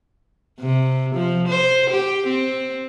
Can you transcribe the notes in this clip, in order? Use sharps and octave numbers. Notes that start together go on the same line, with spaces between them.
C3
F3
C5
G4
C4